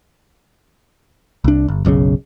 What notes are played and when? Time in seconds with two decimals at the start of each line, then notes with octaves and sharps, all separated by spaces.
1.44 C2 D4
1.68 G1
1.85 F#1 B1 A2 C#3